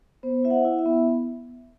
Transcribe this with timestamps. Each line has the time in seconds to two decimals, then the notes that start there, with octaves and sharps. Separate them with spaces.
0.23 B3 C5
0.44 E4 E5
0.50 F#5
0.65 E4
0.79 E5
0.86 B3